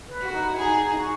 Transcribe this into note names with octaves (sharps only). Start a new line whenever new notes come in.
B4
F#4
D#4
E4
D#4 G#4
F#4